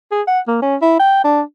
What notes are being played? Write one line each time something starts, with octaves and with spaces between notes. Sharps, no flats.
G#4
F#5
A#3
C#4
E4
G5
D4